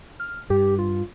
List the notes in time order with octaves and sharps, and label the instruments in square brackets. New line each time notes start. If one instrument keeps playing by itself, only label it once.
[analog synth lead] F6
[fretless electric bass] G2 [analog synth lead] G4
[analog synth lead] F4